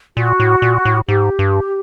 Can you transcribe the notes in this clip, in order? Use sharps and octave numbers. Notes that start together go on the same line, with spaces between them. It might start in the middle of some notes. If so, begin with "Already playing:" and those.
A#2 F#4
A2
A#2
A2
G#2 G4
G2